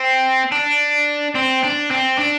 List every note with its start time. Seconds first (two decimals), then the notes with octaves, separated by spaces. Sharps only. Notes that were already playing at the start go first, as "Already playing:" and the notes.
Already playing: C4
0.52 D4
1.35 C4
1.63 D4
1.91 C4
2.19 D4